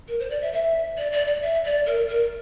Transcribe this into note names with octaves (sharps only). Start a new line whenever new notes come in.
A#4
C5
D5
E5
E5
D5
D5
D5
E5
D5
A#4
A#4